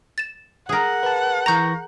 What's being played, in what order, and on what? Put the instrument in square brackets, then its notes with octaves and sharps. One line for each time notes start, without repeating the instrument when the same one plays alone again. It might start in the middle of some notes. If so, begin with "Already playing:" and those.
[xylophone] A6 E7
[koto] G#4 A#4 [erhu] F#5
[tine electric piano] B4 A5
[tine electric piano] E3 C#6 A#6 [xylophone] A#5 G6